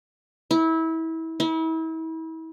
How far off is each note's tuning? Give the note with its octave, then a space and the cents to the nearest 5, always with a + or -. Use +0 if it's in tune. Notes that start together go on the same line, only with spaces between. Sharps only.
E4 -25
E4 -35